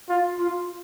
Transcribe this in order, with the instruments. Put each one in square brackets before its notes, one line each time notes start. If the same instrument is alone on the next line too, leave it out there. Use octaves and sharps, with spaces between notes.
[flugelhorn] F4
[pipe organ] F4